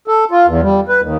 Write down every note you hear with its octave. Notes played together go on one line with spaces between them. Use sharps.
A4
F4
E2
G3
B4
D#2